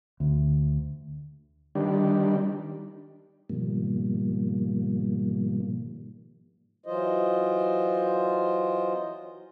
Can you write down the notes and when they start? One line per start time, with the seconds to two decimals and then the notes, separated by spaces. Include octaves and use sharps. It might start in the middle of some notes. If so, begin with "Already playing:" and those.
0.20 D2
1.75 D#3 G3 D4
3.50 G#2 B2 D#3 F3 G3 A#3
6.86 E3 F#3 F4 C5 D#5